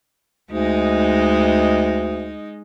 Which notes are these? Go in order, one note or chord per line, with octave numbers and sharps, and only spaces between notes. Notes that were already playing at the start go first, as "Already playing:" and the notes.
D2 G#3 D#4